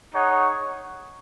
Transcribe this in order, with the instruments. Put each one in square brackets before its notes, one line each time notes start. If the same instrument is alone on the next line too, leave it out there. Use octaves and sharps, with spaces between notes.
[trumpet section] D#4 G#4 C#5 F#5